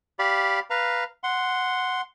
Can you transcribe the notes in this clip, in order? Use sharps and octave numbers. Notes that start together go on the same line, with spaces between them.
G4 D5 F5 B5
B4 F5 A#5
F#5 C6